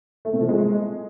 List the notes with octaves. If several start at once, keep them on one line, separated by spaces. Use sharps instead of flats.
A3
C3
F3
G#3